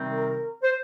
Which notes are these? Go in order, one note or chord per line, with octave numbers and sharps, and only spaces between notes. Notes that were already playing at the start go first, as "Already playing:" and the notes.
Already playing: C3 D#3 G3 C4 D#4
A#4
C5